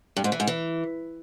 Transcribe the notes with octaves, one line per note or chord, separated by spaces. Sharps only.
G2
G#2
E3
G#2
E3